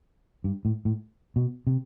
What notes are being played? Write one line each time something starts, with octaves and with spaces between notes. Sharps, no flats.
G2
A2
A2
B2
C3